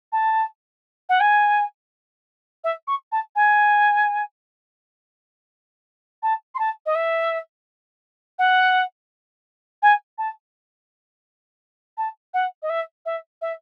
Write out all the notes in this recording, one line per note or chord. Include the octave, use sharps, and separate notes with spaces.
A5
F#5
G#5
E5
C#6
A5
G#5
A5
C6
A5
D#5
E5
F#5
G#5
A5
A5
F#5
D#5
E5
E5
E5